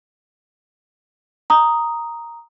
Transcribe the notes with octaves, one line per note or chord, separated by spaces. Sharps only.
A#5 D#6